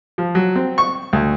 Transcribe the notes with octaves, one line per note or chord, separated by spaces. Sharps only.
F3
F#3
C4
C#6
D2